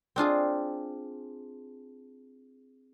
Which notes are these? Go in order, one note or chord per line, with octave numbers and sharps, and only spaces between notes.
C4 D4 F4 G#4